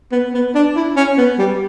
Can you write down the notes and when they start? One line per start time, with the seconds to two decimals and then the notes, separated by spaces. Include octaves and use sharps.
0.12 B3
0.34 B3
0.55 D4
0.76 E4
0.96 C#4
1.18 B3
1.38 G3